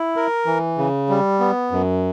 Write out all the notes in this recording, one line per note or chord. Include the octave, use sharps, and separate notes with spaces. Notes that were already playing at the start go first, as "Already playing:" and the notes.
Already playing: E4
A#4
E3
C#3
G3
B3
F#2